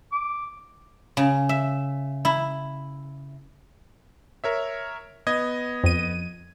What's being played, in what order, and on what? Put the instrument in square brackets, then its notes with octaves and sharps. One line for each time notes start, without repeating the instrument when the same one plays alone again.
[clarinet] D6
[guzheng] C#3
E5
E4
[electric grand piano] A#4 C#5 E5
B3 D#5 G#6
[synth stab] F2 D#7